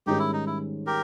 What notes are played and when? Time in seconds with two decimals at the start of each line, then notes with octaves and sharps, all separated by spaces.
0.06 G#2 D#3 G3 C#4 D#4 G4 G#4
0.19 E4
0.33 D#4
0.46 E4
0.86 G4 A#4